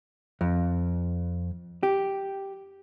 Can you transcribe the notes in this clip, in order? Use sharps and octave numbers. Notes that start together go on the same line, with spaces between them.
F2
G4